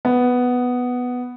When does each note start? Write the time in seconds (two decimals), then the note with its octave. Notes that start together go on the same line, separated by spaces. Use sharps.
0.05 B3